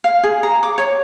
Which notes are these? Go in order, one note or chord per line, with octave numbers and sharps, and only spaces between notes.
F5
G#4
A#5
D6
C#5